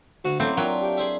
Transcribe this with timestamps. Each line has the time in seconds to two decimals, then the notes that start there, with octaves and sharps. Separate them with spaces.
0.25 D2 F#4
0.40 F#2 F#3 A3 A#3 C4 E4
0.57 F#3 D4 F4 A4 A#4 E5 G5
0.81 G4
0.97 G#4 C5 E5